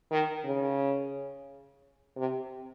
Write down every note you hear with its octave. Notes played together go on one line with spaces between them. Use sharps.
D#3
C#3
C3